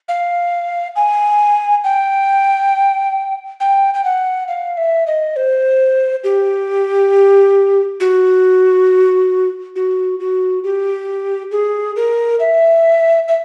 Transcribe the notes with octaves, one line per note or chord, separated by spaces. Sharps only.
F5
G#5
G5
G5
G5
F#5
F5
E5
D#5
C5
G4
F#4
F#4
F#4
G4
G#4
A#4
E5
E5